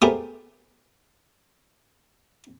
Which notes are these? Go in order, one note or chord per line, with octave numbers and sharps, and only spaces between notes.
A3 B3 G4 G#4 A#4 C5